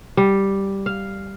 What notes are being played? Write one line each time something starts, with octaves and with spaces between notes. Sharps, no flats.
G3
F5